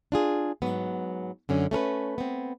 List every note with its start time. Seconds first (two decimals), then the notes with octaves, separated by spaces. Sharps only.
0.12 D4 F4 G#4
0.62 G#2 F#3 B3
1.49 F#2 D3 C#4
1.71 A3 C#4 A#4 B4
2.18 B3 C4